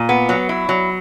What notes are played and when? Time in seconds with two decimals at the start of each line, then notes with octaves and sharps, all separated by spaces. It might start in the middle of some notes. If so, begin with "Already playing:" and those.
Already playing: A#2
0.09 B3
0.29 F#3
0.49 E4
0.69 F#3